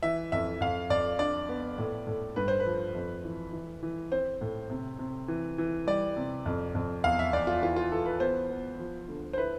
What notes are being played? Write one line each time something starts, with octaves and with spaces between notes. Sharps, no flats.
E3 E5
F2 E5
F2 F5
F2 D5
D4 D5
B3
A2
A2
G2 B4
C5
B4
F3
F2
E3
E3
E3
C4 C5
A2
C3
C3
E3
E3
G3 D5
C3
F2
F2
E2 F5
E5
E2 D5
F4
E3 F4
F4
E3 A4
B4
B3 C5
B3
F3
D2
C5
E4 B4